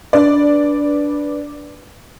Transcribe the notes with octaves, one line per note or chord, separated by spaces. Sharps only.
D4 B4 D5